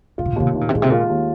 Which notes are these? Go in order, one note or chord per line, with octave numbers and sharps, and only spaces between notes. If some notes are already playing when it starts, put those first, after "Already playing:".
A#2 F4
C3
A#2
D#2 C3
A#2
C3 D#3
A#2
C3
A#2 G#3
C3
A#2 F4
D#2